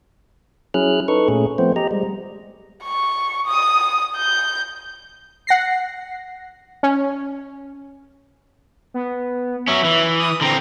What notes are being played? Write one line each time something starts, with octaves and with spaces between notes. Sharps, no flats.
F#3 C#4 E4 G#4 F6 F#6
D#4 A4 B4 C#6
A#2 A3 C#4 G#4
F3 A3 B3 C4 C5
G4 D#5 A#5
G3 G#3
C#6
D#6
G6
F#5 A#6 C7
C#4
B3
F#3 C#4 E5
E3
D#6
D3 C4 A#5